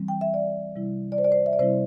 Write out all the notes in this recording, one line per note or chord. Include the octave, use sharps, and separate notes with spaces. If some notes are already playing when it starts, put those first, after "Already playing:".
Already playing: E3 G3 C4
G5
E5
D5
C3 G3 E4
D5
C5
D5
C5
E5
D5
C3 G3 C4 E4 C5